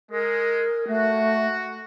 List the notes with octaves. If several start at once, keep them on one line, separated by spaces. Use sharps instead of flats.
G#3 A#4
A3 F#4